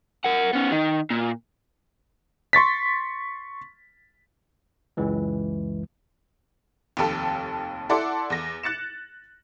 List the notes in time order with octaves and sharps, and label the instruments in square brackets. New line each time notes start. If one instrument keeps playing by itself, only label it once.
[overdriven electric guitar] A#4 F#5
B3 C#4
D#3
A#2
[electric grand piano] C6 C#6 A6 B6
[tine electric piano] C#2 F#2 E3 G#3
[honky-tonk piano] F1 D#2 A4
E4 A4 D5 F#5 C6 D6
E2 A#6
F#6 A6 C#7 E7